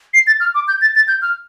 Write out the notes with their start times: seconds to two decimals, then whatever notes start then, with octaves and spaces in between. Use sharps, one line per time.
0.14 C7
0.27 A6
0.40 F6
0.55 D6
0.68 G6
0.81 A6
0.95 A6
1.08 G6
1.22 F6